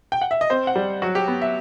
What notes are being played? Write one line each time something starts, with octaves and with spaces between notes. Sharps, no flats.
G5
F#5
E5
D#5
C4 C5
F#5
G3
F#3 F#4
G4
B3
E5